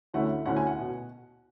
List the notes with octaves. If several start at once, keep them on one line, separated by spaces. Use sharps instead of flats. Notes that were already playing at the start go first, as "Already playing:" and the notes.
D2 D3 A3 C#4 E4 F#5
D2 D3 A3 C#4 E4 F#5
G#5
F#5
B2